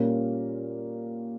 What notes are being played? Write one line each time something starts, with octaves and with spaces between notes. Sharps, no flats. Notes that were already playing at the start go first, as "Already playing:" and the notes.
Already playing: A#2 G3 C#4 F4 A#4